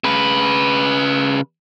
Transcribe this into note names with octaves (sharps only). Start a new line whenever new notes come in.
C#3 B4